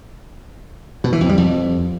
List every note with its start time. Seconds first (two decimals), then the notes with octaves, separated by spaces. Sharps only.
1.04 B2
1.12 E3
1.21 F2
1.29 G3
1.38 F2